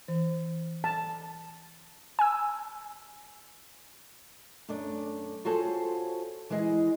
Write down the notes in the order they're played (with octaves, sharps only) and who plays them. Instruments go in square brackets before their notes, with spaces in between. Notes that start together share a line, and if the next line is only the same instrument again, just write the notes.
[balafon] E3
[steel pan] A5
[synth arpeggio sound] G#5 E6
[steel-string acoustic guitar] F#2 A3 D4 D5
F4 F#4 G#4 A4 C5 C#5
E3 G#3 E4 G#4 D#5